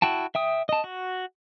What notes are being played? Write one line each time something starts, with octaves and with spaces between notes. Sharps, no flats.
E4 F#4 G5 A5
E5 G5 D#6
D#5 A5
F#4